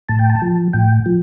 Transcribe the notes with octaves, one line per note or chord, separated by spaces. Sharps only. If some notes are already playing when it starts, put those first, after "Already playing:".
A2 A5
G5
A5
F3
A2 G5
F3